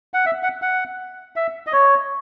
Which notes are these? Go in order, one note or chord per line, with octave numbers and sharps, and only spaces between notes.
F#5
E5
F#5
F#5
E5
D#5
C#5